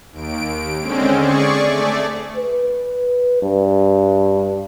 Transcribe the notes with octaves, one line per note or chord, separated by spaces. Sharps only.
D#2 D7
D3 G#3 C4 C#4
G#4 D5 C#6
A3 D5
B4
G2